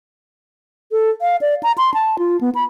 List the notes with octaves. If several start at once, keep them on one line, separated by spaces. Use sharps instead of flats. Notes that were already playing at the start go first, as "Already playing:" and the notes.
A4
F5
D5
A#5
C6
A5
F4
B3
B5